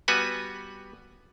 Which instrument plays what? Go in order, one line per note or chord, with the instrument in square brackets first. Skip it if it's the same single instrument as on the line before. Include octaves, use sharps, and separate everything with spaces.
[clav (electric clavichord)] G3 B3 F#4 B4 G#5